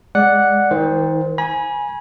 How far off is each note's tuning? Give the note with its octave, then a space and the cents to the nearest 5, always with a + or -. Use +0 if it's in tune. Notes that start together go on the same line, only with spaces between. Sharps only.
G#3 -10 D5 -5 F#5 -5
D#3 +40 C5 +0
G#5 +0 B5 -40